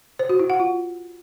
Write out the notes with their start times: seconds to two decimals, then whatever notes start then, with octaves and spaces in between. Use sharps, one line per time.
0.19 C5
0.29 F#4
0.40 E4
0.50 F#5
0.60 F4